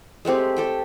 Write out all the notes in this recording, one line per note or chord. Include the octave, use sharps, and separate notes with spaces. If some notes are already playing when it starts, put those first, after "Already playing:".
G#3 A3 C4 G4
G4 A4 G5